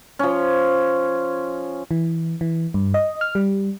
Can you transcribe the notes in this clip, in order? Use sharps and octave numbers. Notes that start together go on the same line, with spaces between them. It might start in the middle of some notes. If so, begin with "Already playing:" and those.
F3 C#4
E3
E3
G2
D#5
F6
G3